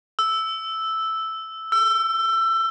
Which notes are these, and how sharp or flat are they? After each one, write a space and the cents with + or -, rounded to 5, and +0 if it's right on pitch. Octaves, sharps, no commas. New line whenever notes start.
E6 -5
E6 +25